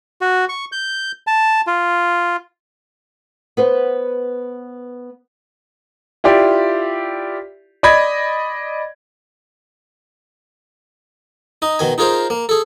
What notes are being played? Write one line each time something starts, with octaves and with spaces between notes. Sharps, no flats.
F#4
C#6
G6
A5
F4
B3 B4 C5
E4 F4 G4 D5
D5 D#5 B5 G#6
D#4 D#5
B2 D#3 G#5
D#4 F4 G#4 A#4 C5
A#3
G#4 A4